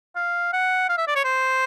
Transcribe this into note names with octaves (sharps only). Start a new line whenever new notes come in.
F5
F#5
F5
E5
D5
C#5
C5